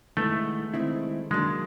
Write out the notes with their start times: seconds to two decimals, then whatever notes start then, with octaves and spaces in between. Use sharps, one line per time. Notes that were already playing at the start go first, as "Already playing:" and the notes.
0.17 D#3 G#3 A3 B3 E4
0.74 D#3 G#3 C4 E4
1.31 D#3 F#3 G#3 A#3 D4